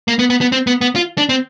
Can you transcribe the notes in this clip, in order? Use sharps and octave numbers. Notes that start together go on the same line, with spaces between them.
A#3
B3
B3
B3
C4
B3
B3
F4
D4
C4